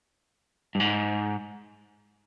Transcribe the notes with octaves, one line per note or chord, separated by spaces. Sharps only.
G2
G#2